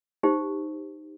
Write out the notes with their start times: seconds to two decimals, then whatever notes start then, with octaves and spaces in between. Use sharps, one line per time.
0.23 D#4 G4 C5